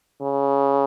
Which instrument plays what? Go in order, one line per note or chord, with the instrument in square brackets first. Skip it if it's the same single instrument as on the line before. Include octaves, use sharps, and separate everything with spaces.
[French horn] C#3